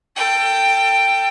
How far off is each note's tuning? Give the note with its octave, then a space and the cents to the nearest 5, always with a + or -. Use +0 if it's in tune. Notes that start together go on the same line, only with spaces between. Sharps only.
A4 +30 G5 +0